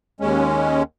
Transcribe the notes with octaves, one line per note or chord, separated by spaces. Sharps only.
D#2 G#3 C#4